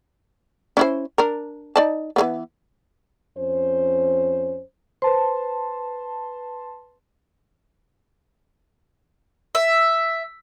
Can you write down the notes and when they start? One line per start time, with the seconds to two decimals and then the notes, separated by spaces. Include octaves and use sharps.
0.77 C#4 E4 C5
1.18 D4 A#4
1.76 D#4 D5 A5
2.16 E3 A#3 B3
3.37 F2 C#4 C5
5.02 B4 C5 A5 C6
9.55 E5